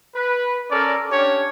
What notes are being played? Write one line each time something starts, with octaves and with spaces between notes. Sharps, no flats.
B4
C#4 A4 A#4 D5
C#4 D4 G4 C#5